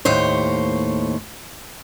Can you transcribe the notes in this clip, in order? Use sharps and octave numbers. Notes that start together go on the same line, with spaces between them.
D#2 A2 C5 C#5